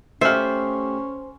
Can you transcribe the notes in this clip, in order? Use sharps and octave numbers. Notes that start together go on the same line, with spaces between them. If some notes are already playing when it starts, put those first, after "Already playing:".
A3 C#4 G4 C5 E5 F6